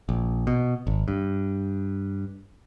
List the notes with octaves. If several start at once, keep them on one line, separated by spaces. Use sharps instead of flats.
A#1
B2
G#1
G2